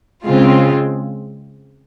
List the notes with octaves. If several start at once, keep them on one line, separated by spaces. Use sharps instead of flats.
C#3 G#3 C4 F4